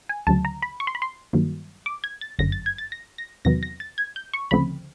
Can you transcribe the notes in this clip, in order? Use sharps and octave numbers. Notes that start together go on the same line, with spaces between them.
G#5
D2 C#3 F#3 A5
A#5
B5
C#6
C6
B5
C6
G2 D#3 F#3 A#3
D6
G#6
A6
G1 F#2 D3 A#6
A6
G#6
A6
A#6
A#6
E2 C3 D#3 F#3 B3 A#6
A#6
A6
G#6
G6
C#6
D2 C#3 F3 A3 C4 B5